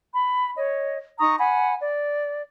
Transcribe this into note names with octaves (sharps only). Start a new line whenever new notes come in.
B5
C#5 D#5
D#4 A#5 C#6 D#6
F#5 G#5 B5
D5